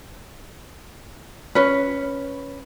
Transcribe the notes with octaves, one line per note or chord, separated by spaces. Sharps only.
C#4 B4